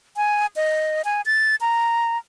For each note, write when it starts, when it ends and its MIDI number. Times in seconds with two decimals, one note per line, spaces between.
0.17 0.46 80
0.56 1.02 75
1.05 1.21 80
1.26 1.55 93
1.61 2.18 82